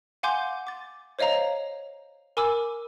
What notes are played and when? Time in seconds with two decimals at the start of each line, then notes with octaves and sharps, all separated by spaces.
0.23 F5 F#5 G#5 C6 D6 G6
0.67 D6 A6
1.19 C5 C#5 D#5 F5 A#5
2.37 A#4 G#5 B5 D6 E6